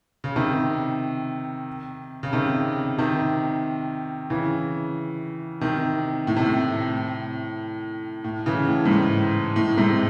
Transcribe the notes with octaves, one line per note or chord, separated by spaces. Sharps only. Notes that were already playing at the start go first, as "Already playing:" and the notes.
C#3
C3 D#3
C#3
C3 D#3
C3 D#3
C#3 E3
C3 D#3
A2
C3
A2
A2
C#3 E3
A2
G#2
A2
A2
G#2 C3